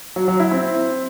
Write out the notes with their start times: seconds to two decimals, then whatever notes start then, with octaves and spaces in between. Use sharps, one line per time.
0.16 F#3
0.28 F#3
0.40 E4
0.51 C4